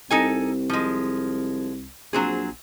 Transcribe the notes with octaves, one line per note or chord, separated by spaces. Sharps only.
C2 D#4 A4 G#5
F3 G#3
A#1 F#3 C4 G#4